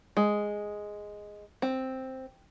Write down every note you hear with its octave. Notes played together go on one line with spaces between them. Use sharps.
G#3
C4